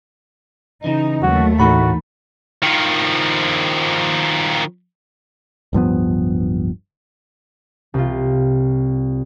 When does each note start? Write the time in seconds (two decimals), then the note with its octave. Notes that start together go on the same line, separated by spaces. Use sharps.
0.84 C#3 E3 D#4
1.23 D#2 F#3 A3 F#4
1.60 A2 E3 D#4 F#4 B5
2.63 D#3 F3
5.73 D1 G2 F3 B3
7.94 C2 F4